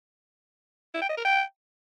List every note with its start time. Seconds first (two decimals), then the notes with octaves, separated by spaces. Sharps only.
0.94 E4
1.02 G5
1.09 D#5
1.17 A#4
1.25 G5